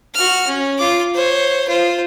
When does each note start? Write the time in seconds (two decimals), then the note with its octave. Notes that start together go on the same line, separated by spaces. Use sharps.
0.14 F#4 F6
0.47 C#4
0.78 F4 D6
1.14 C5 C#5
1.68 F4 C5